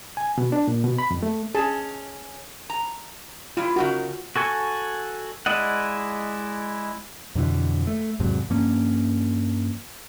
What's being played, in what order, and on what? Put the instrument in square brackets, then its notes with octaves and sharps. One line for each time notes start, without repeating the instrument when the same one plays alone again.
[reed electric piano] G#5
B2
D4
A#2
B2
B5
F2
A3
[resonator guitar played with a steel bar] C#4 [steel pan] G#4 A5
[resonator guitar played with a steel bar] A#5
[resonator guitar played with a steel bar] G3 E4 [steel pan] F4
[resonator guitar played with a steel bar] C#3 D#4 A#4 [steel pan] F#4
[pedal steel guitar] F#4 A4 G#5 C#6
G#3 E4 D5 D#5 F#5
[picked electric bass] F2 B2 D3 E3
A3
E2 G#2 C3 F#3
G2 F3 A#3 C#4